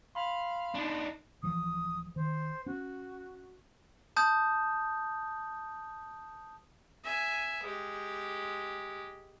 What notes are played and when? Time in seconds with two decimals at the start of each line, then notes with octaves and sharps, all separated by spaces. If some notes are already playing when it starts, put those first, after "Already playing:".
0.15 F5 B5 C6
0.74 D4 D#4
1.43 D1 E3 F3 D#6
2.16 D#3 C5
2.66 C#4 F#4
4.17 A5 D#6 G6
7.04 E5 G#5
7.63 G#3 G4